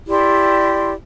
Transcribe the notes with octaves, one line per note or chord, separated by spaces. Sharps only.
E4 G4 D5 C6